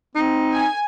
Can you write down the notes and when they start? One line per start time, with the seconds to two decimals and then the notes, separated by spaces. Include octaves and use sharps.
0.15 C4 D#4
0.52 G#5